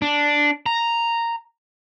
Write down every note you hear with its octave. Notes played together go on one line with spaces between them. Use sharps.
D4
A#5